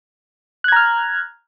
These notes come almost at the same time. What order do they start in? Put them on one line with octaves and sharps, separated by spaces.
F#6 G#6 A#5 F6